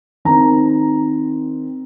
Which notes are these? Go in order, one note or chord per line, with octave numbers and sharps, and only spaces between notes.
D#3 C4 A#5